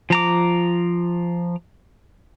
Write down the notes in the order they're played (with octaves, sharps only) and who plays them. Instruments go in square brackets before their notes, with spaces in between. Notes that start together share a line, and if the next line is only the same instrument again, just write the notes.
[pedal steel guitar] F3 A#5 D6